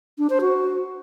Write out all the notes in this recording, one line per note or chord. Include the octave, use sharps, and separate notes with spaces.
D4
C5
F#4